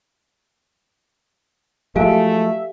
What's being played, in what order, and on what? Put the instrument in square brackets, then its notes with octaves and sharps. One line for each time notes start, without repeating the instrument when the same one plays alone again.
[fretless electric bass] F3 F#3 G#3 [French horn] A3 [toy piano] G4 F5 G#5 [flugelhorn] E5